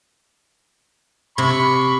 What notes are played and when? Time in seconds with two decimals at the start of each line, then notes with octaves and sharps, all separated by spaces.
1.38 C3 B5 C#6